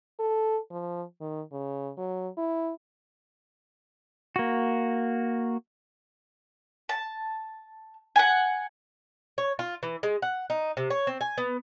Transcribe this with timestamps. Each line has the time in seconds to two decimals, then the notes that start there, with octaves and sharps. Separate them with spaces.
0.19 A4
0.71 F3
1.21 D#3
1.52 C#3
1.97 F#3
2.37 E4
4.36 A#3 F#4
6.89 A5
8.16 F#5 G#5
9.38 C#5
9.59 F4
9.83 E3
10.03 G#3
10.22 F#5
10.50 D#4
10.77 C3
10.90 C#5
11.07 C4
11.21 G#5
11.38 B3